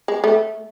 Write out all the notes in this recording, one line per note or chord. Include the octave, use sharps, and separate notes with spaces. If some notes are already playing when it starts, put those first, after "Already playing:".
G#3
A3